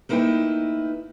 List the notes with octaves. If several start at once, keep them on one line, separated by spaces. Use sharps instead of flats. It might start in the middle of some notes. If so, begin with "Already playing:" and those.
A3 A#3 D#4 E4 B4 G5